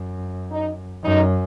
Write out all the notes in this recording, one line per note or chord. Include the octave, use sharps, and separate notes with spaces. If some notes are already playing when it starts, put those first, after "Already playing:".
Already playing: F#2
D#4
F#2 D#4